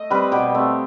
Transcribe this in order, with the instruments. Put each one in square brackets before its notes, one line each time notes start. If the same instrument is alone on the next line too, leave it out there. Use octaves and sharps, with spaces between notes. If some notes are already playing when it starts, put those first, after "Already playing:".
Already playing: [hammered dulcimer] A3 D#5
G3 C4 B4
B2 G4
A3 C4